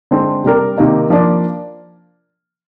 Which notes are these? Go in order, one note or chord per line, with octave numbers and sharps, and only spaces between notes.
D3 G#3 C4
C3 G3 D4 G4 A#4
C3 D#3 A#3 D#4
F3 A#3 D4